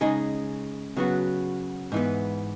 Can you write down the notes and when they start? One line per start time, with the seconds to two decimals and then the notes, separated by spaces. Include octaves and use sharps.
0.01 C#3 G#3 D#4 G#4
0.97 C#3 F#3 B3 F#4
1.92 G#2 E3 B3